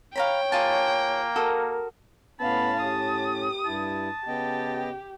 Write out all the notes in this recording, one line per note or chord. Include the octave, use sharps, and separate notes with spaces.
C#5 F5 G5 A#5 B5
A#3 F4 G#4 A5
F#4 A4 A#4 D#6
A2 B3 C#4 F5 A5 B5
G4 D#6
G2 E4 A5
C#3 B3 G4 D#5 G5